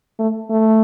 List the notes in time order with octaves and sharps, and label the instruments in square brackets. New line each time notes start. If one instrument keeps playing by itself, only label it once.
[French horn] A3
A3